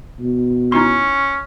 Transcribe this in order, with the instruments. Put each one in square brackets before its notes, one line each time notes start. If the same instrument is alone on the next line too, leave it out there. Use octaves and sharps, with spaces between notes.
[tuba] B2
[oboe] C#4 [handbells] D#4 E4 C6